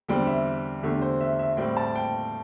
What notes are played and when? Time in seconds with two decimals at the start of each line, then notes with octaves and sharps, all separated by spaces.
0.08 E2 D3 G3 C4 G5
0.27 E5
0.83 E2 D3 A3 G4
1.02 C5
1.21 E5
1.39 E5
1.57 A2 G3 C4 G5
1.77 A5
1.96 G5